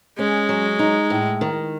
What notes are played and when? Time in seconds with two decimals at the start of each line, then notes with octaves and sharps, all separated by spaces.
0.18 G#3 C#4
0.49 F#3
0.79 D#4
1.10 A2
1.41 D#3